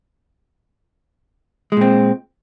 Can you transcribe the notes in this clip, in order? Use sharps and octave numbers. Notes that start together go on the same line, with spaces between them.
A#2 G#3 C4